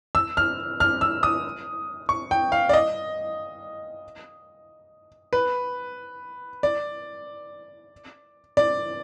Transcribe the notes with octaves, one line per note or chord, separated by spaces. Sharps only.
E6
F6
F6
E6
D#6
C#6
G5
F5
D5
D#5
B4
D5
D5